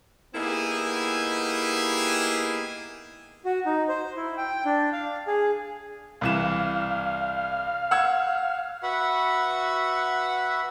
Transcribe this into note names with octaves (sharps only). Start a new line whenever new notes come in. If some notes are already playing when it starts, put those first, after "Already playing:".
A#3 B3 D#4 E4 G4 G#4
F#4
D#4
C5
E4
G5
D4
F5
G#4
C2 E3 F5 E7
F#5 E6 G#6
F#4 B4 E5 F#5